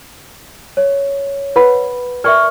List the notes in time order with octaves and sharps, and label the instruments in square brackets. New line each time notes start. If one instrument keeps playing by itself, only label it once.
[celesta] C#5
[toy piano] B4 F#5 B5
[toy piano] A#4 D5 G5 [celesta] E5 C#6 F6